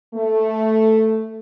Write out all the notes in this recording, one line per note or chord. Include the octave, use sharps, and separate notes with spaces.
A3